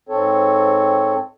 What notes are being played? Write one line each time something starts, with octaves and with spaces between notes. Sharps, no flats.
G#2 C4 A4 C#5